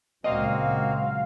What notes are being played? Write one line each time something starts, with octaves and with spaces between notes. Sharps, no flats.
C#2 A#2 F#3 A#3 C4 F#4 D#5 F5